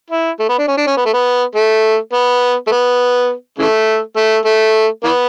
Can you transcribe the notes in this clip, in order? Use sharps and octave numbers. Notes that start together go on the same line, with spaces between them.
E4
A3
B3
D4
C#4
D4
C#4
B3
A3
B3
A3
B3
A3
B3
C#3 E3 A3
A3
A3
E3 B3